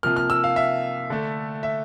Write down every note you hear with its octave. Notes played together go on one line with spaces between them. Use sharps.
C3 F3 A#3 F6
F6
E6
F5
E5
D3 A3
E5